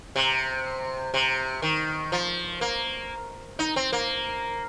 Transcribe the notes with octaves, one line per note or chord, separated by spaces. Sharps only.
C3
C3
D#3
F3
A#3
D#4
C4
A#3